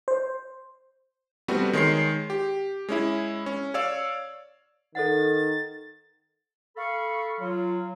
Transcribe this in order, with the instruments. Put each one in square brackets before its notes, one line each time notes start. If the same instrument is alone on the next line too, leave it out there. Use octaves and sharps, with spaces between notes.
[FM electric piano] C5
[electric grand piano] G3 A3 B3 C4 F#4
D#3 G#3 C#5 C6 C7
G4
G#3 C#4 E4
C#4
C#5 D5 F5 E6
[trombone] D#3 [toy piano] A4 C5 F#5 [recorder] A6
[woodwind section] A4 F5 B5 C#6
F#3 F4